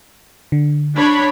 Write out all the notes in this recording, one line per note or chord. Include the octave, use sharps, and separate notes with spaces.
D3
D4 C#5 B5